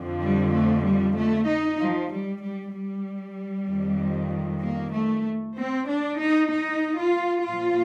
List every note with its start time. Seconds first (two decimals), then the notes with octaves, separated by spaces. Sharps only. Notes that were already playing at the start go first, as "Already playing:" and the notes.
Already playing: F2 D3 F3
0.23 G3
0.53 A3
0.84 G3
1.16 A3
1.47 D#4
1.79 F3
2.11 G3
2.42 G3
2.73 G3
3.68 F2 D#3
4.62 A#3
4.93 A3
5.56 C4
5.88 D4
6.19 D#4
6.50 D#4
6.97 F4
7.44 A#2 F3 F4